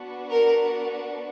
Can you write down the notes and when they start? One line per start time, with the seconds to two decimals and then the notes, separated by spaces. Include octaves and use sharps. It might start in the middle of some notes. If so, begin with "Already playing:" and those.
Already playing: B3 D4 F#4
0.30 A#4